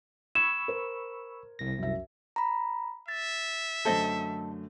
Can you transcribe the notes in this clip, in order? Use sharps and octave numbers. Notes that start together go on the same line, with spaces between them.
B5 C#6 E6 G#6 E7
A#4 C5
C2 A#6
F#2 E5
A#5 B5
E5 A6
F#2 D3 A3 A4 C5 D#5